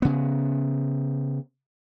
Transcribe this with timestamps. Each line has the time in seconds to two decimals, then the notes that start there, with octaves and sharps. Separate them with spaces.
0.02 C#3 B3